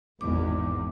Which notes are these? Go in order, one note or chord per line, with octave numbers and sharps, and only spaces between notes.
G#1 E2 D6